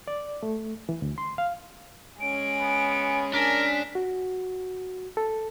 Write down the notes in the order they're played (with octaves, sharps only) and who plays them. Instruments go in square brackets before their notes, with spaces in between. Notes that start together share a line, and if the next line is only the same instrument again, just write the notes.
[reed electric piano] D5
A3
E3
D2
C6
F5
[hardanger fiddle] G#3 C#4 [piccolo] D7
[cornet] B3
[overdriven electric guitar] D4 [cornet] A#4 [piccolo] B6
[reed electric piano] F#4
A4